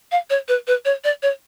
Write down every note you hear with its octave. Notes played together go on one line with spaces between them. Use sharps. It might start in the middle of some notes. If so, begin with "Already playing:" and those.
F5
C#5
B4
B4
C#5
D5
C#5